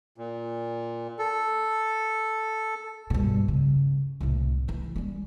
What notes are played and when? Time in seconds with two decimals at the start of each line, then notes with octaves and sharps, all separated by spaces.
0.18 A#2
1.19 A4
3.10 G2 B2
3.48 C#3
4.20 C2 A2
4.68 E3 D#4
4.96 G3 C#4